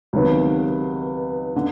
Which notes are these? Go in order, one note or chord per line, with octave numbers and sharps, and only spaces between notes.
C#2 C3 D#3 F#3 B3
D3